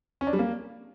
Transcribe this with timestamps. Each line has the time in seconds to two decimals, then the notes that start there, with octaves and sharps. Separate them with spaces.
0.21 C#4
0.27 D4
0.33 G3
0.39 A#3